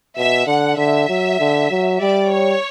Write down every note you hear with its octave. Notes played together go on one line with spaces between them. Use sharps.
B2 E5
D3 F#5
D3 E5
F#3
D3
F#3
G3 D5
C#5